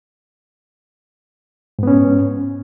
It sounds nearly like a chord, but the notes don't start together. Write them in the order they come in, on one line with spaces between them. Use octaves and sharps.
G#2 B3 C#4